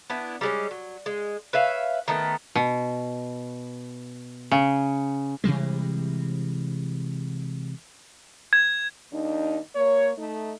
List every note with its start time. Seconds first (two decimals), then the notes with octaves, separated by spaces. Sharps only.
0.10 B3 D4 E4
0.41 G3 G#3 C#4
0.71 F#3
1.06 G#3
1.53 B4 C#5 E5 F5
2.08 D#3 A3 B3
2.55 B2
4.51 C#3
5.44 C3 E3 G3 G#3
8.53 G#6
9.12 D#2 D4 D#4
9.75 A#3 C#5
10.17 A3 D#4